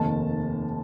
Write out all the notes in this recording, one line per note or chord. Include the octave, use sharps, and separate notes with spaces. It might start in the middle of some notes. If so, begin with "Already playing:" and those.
Already playing: F1 D#2 D#3 A5